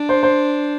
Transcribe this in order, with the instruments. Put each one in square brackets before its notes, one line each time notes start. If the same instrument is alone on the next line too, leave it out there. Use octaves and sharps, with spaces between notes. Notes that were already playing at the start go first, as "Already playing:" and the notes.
Already playing: [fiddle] D4
[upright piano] C5
C5